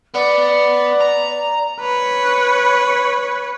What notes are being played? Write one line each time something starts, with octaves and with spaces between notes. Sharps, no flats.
B3 D5
A#5
B4 C#5